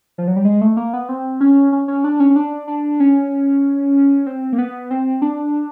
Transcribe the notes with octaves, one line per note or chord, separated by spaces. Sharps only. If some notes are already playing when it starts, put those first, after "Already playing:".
F3
F#3
G3
G#3
A3
A#3
B3
C4
C#4
C#4
C#4
D4
C#4
C#4
D4
D4
C#4
C4
A#3
B3
C4
D4